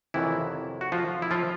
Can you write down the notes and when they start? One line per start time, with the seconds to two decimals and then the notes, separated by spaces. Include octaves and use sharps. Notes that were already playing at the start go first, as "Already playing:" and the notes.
0.14 F2 C3 D#3 E3 F#3 E4
0.81 F#4
0.92 F3 F4
1.22 E4
1.31 F3 F4